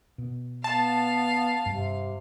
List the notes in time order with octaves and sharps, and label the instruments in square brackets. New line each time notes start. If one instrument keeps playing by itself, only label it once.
[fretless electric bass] B2
[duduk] B3 [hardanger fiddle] F5 [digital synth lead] A5
[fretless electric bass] G2 [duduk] C3